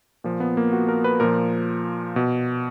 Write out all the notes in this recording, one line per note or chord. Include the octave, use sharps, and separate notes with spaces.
A#2 F3
B3
A#3
F#4
A#4
B4
A#2 F3 A#4
B2